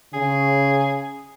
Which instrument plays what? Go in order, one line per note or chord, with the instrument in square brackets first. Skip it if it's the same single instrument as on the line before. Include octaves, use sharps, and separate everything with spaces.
[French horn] C#3 [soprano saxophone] G#4